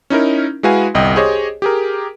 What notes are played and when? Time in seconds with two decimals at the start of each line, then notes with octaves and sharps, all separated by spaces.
0.10 C#4 D#4 E4 A#4
0.63 G#3 E4 F#4 B4 F5 G#5
0.94 G1 C2 D#5 G5
1.15 G4 G#4 C5 C#5 D#5
1.62 G4 G#4 A#4